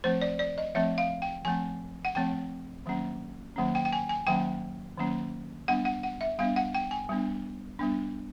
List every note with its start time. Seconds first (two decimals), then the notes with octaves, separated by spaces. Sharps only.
0.04 F3 A3 C4 C5
0.22 D5
0.39 D5
0.58 D#5
0.75 F3 A3 C4 E5
0.98 F5
1.22 G5
1.45 F3 A3 C4 G#5
2.05 F#5
2.15 F3 A3 C4 G5
2.86 D#3 F#3 A#3 C#4
3.56 D#3 F#3 A#3 C#4
3.75 G5
3.85 G5
3.93 G#5
4.09 G#5
4.27 D#3 F#3 A#3 C#4 G5
4.98 D#3 F#3 A#3 C#4
5.68 G3 B3 D4 F#5
5.85 F#5
6.03 F#5
6.21 E5
6.39 G3 B3 D4 F5
6.56 F#5
6.75 G5
6.91 G#5
7.09 G3 B3 D4
7.79 G3 B3 D4